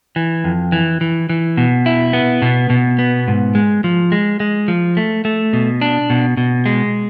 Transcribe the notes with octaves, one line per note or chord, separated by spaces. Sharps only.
E3
F2
E3
E3
E3
B2
E4
B3
B2
B2
B3
G#2
G#3
F3
G#3
G#3
F3
A3
A3
B2
D4
B2
B2
G#3